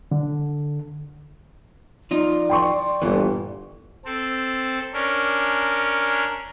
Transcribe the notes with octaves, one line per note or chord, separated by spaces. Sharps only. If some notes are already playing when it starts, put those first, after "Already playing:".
D3
F3 D#4 F4 D5
G5 C6 C#6
G1 A#2 E3
C4 A4
C#4 D4 A#4